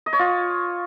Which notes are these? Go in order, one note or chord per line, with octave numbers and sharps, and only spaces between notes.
D#5
C#5
F4